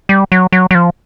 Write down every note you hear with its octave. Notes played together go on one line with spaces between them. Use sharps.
G3
F#3
F#3
F#3
F3